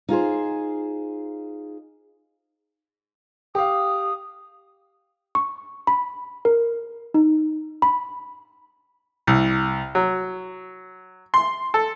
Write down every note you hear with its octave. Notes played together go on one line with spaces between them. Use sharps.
D#4 F4 G#4 C5
G4 F5 D#6
C#6
B5
A#4
D#4
B5
C2
F#3
C6
A4